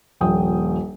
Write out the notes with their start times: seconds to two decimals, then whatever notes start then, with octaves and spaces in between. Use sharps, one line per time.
0.21 D#1 A#1 G5 D#6